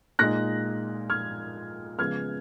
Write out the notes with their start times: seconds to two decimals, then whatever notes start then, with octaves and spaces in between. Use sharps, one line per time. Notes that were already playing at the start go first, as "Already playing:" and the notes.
0.19 A#2 G#3 D#4 F#6 A#6
1.10 F6 G#6
1.99 C#3 F3 G#3 B3 F6 G#6